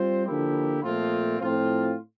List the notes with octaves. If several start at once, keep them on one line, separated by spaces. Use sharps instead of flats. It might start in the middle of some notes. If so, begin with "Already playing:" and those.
Already playing: G3 C4 F4 C5
D3 F3 A#3 E4 G4
A#2 F3 A3 C4 F4
A2 F3 C4 F4